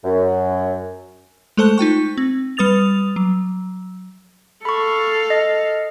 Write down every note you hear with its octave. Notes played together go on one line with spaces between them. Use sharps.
F#2
G#3 A3 A4 C5 A5 F#6
D#4 F4 G5 C#6
C4
G3 B4 D#6 A6 F7
F#3
A4 F5 B5 C#6
D#5